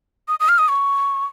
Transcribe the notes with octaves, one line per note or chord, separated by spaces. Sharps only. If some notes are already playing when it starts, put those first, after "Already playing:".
D#6
D#6
F6
D#6
C#6